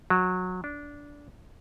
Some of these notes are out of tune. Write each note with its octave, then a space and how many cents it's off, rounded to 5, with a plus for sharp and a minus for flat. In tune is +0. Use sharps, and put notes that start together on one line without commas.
F#3 -20
D4 -15